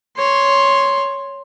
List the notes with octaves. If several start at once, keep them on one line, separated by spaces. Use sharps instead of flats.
C#5 C6